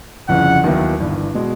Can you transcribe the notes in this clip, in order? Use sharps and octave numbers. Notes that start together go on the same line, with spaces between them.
G1 F2 C#3 E3 F#5
D#2 D#3 F#3 B3 E4
G1 G2 E3
B2 G#3